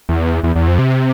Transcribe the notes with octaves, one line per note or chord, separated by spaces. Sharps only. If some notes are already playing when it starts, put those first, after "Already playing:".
E2
E2
E2
F2
C3